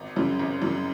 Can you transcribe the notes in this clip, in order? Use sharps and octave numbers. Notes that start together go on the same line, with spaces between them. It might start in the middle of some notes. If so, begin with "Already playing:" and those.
Already playing: G#1
F#2 C#3 F#3
G#1
F#2 C#3 F#3